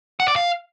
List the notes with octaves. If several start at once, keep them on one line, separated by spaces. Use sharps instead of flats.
F#5
D5
F5